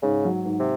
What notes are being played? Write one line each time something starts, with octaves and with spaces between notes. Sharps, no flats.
G#2 C#3
F#3
G#2
C3